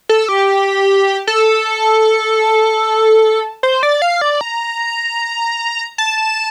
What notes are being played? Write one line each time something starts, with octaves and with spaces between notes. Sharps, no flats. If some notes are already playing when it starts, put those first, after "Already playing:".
A4
G4
A4
C5
D5
F5
D5
A#5
A5